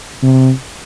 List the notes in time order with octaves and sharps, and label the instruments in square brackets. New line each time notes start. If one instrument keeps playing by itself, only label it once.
[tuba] C3